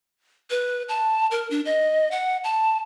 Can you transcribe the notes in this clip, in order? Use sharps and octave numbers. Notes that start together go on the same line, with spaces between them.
B4
A5
A#4
D4
D#5
F#5
A5